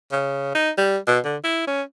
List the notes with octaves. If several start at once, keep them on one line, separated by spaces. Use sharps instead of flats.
C#3
D#4
G3
B2
D3
E4
C#4